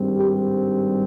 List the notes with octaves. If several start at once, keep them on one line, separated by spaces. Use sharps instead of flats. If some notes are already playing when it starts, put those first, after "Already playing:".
Already playing: G#1 G2 G3 C4
G4